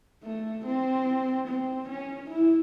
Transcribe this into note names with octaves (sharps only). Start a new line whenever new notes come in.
A3
C4
C4
C#4
E4